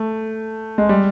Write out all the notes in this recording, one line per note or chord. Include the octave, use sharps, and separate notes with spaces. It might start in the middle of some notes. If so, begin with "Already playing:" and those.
Already playing: A3
G#3
G3